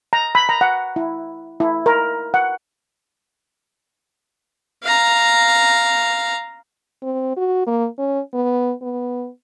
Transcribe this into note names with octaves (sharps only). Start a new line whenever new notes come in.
A#5
B5
A#5
F#5
E4
E4
A#4
F#5
F5 A#5
C4
F#4
A#3
C#4
B3
B3